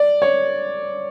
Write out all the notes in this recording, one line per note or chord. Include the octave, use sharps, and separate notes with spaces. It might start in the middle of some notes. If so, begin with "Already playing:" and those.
Already playing: D5
C#5